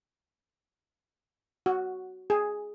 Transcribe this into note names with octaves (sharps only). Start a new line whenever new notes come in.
F#4
G#4